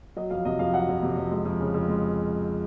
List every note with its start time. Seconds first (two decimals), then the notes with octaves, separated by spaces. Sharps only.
0.16 F#3 D#5
0.30 F2 F5
0.45 C3 D#5
0.59 F2 F5
0.74 F#3 F#5
0.88 F2
1.03 C3
1.17 F2
1.31 G#3
1.45 F2
1.60 C#3
1.74 F2
1.88 G#3